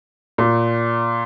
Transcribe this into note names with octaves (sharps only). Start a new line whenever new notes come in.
A#2